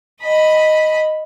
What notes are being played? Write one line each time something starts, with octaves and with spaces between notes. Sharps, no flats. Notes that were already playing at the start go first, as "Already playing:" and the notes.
D#5 B5